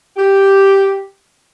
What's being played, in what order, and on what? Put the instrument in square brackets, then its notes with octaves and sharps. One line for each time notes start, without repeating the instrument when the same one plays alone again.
[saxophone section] G4